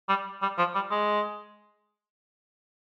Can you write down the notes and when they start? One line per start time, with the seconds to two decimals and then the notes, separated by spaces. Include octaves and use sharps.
0.09 G3
0.42 G3
0.58 F3
0.75 G3
0.91 G#3